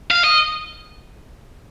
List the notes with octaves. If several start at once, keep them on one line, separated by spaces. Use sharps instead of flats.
F5
D#5